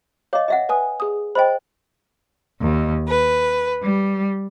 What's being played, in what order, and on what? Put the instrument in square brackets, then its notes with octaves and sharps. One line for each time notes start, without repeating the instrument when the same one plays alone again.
[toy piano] C#5 D#5 [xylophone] F5 D6
[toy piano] D#5 E5 F#5
[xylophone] B4 G#5 D#6
G#4 D#6
[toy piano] C5 D#5 [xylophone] G5 B5
[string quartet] D#2
B4
G3